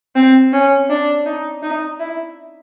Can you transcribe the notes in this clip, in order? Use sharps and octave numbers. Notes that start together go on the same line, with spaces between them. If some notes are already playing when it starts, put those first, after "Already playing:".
C4
C#4
D4
D#4
D#4
E4